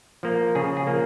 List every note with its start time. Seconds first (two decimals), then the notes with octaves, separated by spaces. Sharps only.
0.23 F3 A#3
0.55 C#3 G#4
0.77 G#4
0.87 F3 A#3